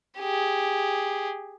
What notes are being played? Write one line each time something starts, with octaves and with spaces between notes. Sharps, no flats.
G4 G#4